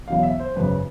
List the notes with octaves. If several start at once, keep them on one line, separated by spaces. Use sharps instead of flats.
E2 B2 F#3 F5
E5
C5
G#1 F#2 C#3 F#3 B4